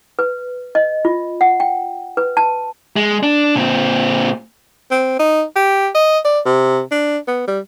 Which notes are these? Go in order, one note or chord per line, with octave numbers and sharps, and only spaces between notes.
B4
D#5
F4
F#5
G5
B4
A5
G#3
D4
A#2 C4
C4
D#4
G4
D#5
D5
C3
D4
B3
G3